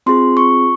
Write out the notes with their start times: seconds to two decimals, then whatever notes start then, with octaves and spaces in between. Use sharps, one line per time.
0.06 C4 F4 G#4 C6
0.37 C#6